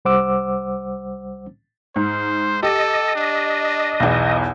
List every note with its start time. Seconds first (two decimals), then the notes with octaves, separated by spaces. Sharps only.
0.05 C2 G3 C5 F#5 D6 E6
1.96 G#2 C5
2.63 G4 A4 D#5
3.15 D4
4.00 B1 E2